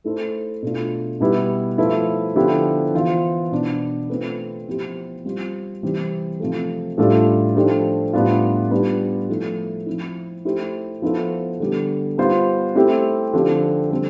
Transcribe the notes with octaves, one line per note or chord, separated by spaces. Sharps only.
A3 E4 A4 C5
B2 A3 D4 F4
B2 G3 B3 E4 B4
F3 A3 E4 B4
D3 F3 B3 E4 G4
E3 B3 F4 C5
B2 B3 D4
A3 C4 F4 B4
F3 B3 E4 G4 C5
G3 C4 F4 C5
C3 E3 G3 C4
C3 F3 A3
A2 G3 D4 F4 A4
F3 A3 D4 G4 C5
A2 G3 B3 D4 F4
G3 B3 D4 F4 B4
F3 A3 E4
F3 C4 E4
A3 E4 G4 C5
F3 B3 E4 A4 C5
D3 G3 B3
G3 B3 F4 C5
A3 C4 E4 G4
D3 F3 C4 G4
D3 G3 C4